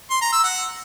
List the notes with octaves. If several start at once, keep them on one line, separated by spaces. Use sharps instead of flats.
C6
A#5
E6
F#5